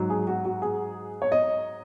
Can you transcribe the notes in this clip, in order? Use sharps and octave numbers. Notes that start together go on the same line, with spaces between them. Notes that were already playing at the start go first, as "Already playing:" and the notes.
Already playing: G#2 F#3
G#4
F#4
F#4
G#4
C#5
D#5